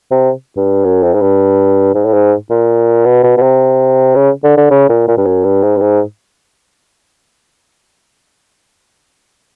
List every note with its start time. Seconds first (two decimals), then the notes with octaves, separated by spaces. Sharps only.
0.11 C3
0.56 G2
0.85 F#2
1.03 F2
1.14 G#2
1.21 G2
1.95 G#2
2.06 A2
2.14 G#2
2.50 A#2
3.05 B2
3.24 B2
3.37 B2
3.42 C3
4.16 C#3
4.44 D3
4.57 D3
4.71 C#3
4.89 A#2
5.08 A#2
5.18 G2
5.26 F#2
5.44 G2
5.63 G#2
5.77 G2
5.81 G#2